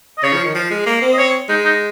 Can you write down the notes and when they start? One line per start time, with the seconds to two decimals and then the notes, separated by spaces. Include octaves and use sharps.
0.18 D#5
0.23 C#3 C#5
0.33 F3
0.44 D#3
0.55 F3
0.71 G#3
0.86 A#3
1.02 C4
1.13 D#5
1.18 C#5
1.49 G#3 D#4
1.65 D#4